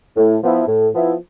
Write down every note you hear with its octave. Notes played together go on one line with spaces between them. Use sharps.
A2
F3 B3 E4
A2
F3 B3 E4